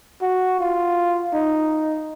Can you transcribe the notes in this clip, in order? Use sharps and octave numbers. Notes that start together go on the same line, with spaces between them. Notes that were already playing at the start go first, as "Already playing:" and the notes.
F#4
F4
D#4